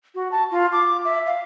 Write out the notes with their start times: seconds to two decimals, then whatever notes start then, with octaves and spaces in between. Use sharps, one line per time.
0.15 F#4
0.32 A5
0.51 F4
0.72 D6
1.05 E5
1.26 F5